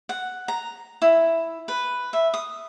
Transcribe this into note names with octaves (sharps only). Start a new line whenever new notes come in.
F#5
A#5
E4
B4
E5
D#6